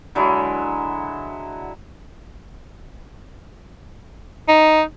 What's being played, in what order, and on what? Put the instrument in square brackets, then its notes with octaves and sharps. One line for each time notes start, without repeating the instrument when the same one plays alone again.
[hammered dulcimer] D3 F#3 G#3 E4
[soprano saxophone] D#4